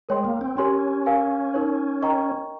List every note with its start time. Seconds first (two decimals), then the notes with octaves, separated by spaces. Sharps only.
0.09 G#3 A#4 C#5 G5 C6
0.25 A#3
0.41 C4
0.57 C#4 G4 A#4 C#5 G#5 C6
1.06 A#4 F5 G#5
1.54 D#4 A#4 C#5
2.02 A#4 D#5 G5 A#5 C#6